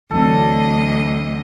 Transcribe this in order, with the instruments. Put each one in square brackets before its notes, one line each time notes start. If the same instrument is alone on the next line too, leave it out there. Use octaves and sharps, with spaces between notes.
[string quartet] D2 D#5 [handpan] E3 F#3 C4 [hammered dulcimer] A4